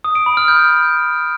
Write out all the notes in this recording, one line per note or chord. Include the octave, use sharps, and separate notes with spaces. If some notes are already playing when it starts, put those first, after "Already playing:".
D#6
D7
B5
F6
G6